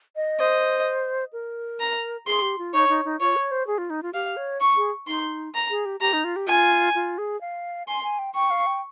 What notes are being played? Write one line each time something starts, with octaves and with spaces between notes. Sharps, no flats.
D#5
C5 D#5
A#4
A#5
G#4 C6
G4
F4
D#4 C#5
D#4
D#4
F4 C#5
C#5
C5
G#4
F4
D#4
F4
G4 F5
C#5
C#6
G#4
D#4 C6
A#5
G#4
G4
G4 A#5
D#4
F4
G4
F4 G#5
F4
G#4
F5
G#5 C6
G#5
G5
G5 C#6
F5
G5